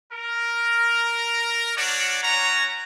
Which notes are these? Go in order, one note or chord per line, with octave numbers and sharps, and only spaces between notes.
A#4
D4 F#4 C#5 D5
C#4 F#4 C#5 A#5